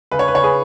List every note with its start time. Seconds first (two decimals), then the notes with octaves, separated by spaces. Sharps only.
0.11 C#3 B4
0.19 C#5
0.28 B4
0.34 C#3 C#5
0.43 G#4 B4